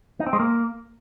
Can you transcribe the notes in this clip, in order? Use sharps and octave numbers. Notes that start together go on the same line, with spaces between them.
D#4
C4
G#3
A#3